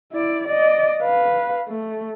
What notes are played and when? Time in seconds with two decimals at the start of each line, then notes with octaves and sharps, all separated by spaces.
0.12 E4 D5
0.48 D5 D#5
1.03 B4 F5
1.68 A3